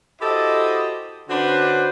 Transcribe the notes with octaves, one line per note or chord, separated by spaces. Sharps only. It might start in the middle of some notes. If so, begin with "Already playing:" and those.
E4 F#4 G4 A4 C5 D#5
D3 C#4 D4 F#4 B4 C5